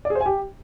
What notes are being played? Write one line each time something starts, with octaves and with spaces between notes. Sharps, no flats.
D5
G#4
C5
G#5
G4